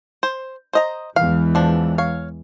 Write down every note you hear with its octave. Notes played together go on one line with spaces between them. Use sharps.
C5
C5 D#5 A#5
E2 E3 G#3 F5
F3 D4
C#5 F5